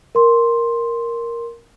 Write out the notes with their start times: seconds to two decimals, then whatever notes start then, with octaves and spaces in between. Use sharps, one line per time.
0.15 A#4 C6